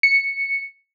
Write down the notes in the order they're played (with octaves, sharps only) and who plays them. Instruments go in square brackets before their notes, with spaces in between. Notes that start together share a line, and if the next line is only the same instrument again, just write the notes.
[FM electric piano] C#7